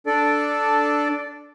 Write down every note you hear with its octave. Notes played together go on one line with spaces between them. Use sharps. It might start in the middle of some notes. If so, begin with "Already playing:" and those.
D4 A4 D5